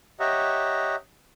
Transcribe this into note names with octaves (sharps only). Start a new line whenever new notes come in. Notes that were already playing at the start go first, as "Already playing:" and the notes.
G4 C#5 D#5 E5 F#5 A#5